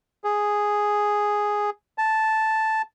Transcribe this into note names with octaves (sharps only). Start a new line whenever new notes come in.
G#4
A5